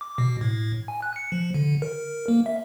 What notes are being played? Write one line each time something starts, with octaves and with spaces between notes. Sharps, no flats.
D6
B2
A2
G#5
F#6
C#7
F3
D3
A#4
A#3
E5